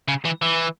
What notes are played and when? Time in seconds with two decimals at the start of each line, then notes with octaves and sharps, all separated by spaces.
0.08 C#3
0.25 E3
0.42 E3